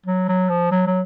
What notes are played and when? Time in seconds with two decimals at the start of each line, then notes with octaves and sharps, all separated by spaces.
0.06 F#3
0.29 F#3
0.50 F3
0.72 F#3
0.87 F#3